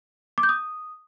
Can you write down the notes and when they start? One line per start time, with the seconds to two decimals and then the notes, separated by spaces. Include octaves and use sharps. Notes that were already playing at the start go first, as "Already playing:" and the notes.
0.38 D6
0.43 G6
0.49 D#6